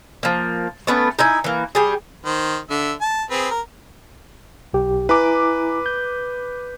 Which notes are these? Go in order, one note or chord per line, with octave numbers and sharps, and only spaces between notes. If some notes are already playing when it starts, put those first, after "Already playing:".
F3 A#3
A3 B3 C#4
D#4 E4 G#5
E3 A#3
G3 G4 G#4
D#3 C5
D3 E5
A5
C4 G#4 B4
A#4
B1 G4
E4 B4 G#5 A#5 D6
G6